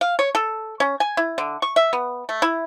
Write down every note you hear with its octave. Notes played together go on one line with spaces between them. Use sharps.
F5
C#5
A4
C#4
G#5
E4
D3
C#6
E5
B3
A3
E4